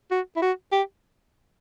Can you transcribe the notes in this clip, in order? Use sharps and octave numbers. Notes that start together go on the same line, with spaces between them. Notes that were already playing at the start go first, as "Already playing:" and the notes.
F#4
E4
F#4
G4